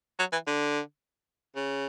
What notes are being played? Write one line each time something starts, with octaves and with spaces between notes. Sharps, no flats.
F#3
E3
D3
C#3